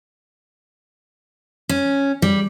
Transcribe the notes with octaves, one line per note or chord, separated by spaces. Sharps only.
C#4
G3